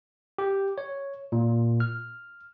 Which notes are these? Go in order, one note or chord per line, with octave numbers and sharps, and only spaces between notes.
G4
C#5
A#2
F6